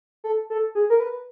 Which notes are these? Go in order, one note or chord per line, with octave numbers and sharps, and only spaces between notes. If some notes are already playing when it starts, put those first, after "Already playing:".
A4
A4
G#4
A#4
B4